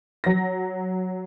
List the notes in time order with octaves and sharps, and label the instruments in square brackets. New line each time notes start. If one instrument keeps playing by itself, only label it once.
[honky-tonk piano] F#3 A#6